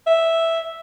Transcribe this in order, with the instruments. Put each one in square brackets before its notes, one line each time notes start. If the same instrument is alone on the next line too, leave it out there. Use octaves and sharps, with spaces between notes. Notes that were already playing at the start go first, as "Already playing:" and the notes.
[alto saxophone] E5